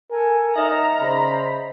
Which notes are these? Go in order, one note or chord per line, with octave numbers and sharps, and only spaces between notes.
A4 A#4 G#5
D#4 C#5 D#5 E5 F#5 A#5 D#6 F6
C#3 C5 D5 B5